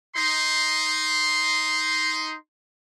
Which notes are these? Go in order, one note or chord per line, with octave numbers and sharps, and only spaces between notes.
D#4 C6